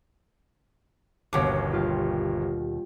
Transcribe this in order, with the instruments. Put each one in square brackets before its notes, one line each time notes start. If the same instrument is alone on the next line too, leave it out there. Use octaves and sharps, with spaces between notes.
[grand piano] G1 C#5 D6 [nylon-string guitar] D#2 B2
[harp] G3 F4 G4